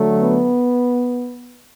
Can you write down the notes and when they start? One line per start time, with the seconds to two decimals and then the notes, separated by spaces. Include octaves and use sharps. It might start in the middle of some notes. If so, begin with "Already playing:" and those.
Already playing: D3 F#3 A3
0.22 B3